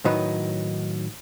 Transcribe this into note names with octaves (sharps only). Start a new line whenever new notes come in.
A2 D#3 F#3 D#4 B4